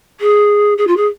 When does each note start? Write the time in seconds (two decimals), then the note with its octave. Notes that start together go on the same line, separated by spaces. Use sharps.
0.20 G#4
0.77 G#4
0.87 F4
0.96 G#4